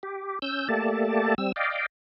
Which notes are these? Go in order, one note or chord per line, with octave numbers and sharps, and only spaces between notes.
G4
C#4 E6 G6
A3 A#3 G4 A4 D5 A5
G3 C4 E6
D5 D#5 F5 G5